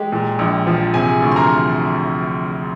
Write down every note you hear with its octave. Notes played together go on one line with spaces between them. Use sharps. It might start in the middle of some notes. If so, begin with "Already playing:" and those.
Already playing: G#3 G4
A#2
A#1
F3
C3 G#4 G#5
D2
C6
A#4 A#5